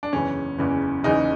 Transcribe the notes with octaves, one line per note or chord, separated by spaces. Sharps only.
D4
F#1 E2 C#3 E3 C#4
F#1 E2 C#3 E3
F#1 E2 C#3 E3 D#4